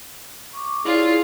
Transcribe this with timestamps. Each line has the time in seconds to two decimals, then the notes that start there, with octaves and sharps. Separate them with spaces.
0.53 C#6 D6
0.85 E4 F4 G#4 C#5 D5